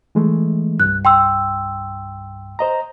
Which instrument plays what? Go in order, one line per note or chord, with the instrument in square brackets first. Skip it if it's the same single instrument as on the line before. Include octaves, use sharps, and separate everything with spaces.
[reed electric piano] E3 G#3 A3
[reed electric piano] C2 G2 [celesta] F#6
[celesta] G5 C6 E6
[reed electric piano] C5 D#5 A#5